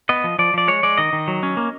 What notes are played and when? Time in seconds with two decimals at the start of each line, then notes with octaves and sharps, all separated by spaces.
0.09 B3 D#5
0.24 F3
0.39 F3 D5
0.54 F3 D5
0.68 G#3 C#5
0.83 G#3 D5
0.98 D#3 D#5
1.13 D#3
1.28 F#3
1.43 C#4
1.57 A#3